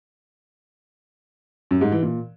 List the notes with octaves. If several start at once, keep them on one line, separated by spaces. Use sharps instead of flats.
F#2
G#2
E3
A#2